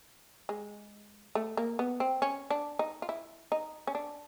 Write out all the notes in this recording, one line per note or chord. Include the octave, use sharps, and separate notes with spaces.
G#3
A3
A#3
B3
C4
C#4
D4
D#4
F4
E4
D#4
C#4
D4